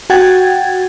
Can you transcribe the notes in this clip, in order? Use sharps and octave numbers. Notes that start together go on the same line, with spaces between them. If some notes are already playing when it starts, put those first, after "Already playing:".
F#4 F#5 G5 G#6 A6